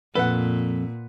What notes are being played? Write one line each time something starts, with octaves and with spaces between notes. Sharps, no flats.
F2 A#2 A4 B4 F#5